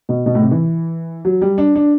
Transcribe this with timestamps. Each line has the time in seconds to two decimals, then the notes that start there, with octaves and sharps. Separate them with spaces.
0.09 B2
0.26 B2
0.35 A2
0.42 C3
0.51 E3
1.25 F#3
1.42 G3
1.58 D4
1.76 D4